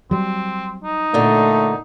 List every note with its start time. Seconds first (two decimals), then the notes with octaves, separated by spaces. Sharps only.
0.11 F#3 G3 C4
0.84 D#4
1.14 A#2 D3 A3